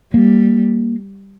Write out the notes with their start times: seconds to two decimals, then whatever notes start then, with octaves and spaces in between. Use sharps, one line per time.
0.13 G3 A#3